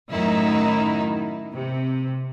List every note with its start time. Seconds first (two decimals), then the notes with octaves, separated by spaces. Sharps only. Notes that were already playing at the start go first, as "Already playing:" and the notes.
0.11 F#2 A2 D#3 F#3 D#4 E4
1.53 C3